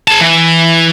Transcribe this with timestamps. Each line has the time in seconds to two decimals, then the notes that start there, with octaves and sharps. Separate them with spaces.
0.08 G#4 A5
0.21 E3